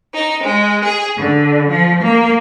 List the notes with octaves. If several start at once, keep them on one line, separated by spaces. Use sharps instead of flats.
D#4
G#3
G#4
D3
F3
A#3